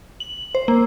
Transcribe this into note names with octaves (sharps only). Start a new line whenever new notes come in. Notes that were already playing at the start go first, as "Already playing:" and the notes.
F#7
C5
A#3